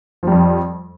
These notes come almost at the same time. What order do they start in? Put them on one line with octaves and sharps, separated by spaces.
F3 G3 F2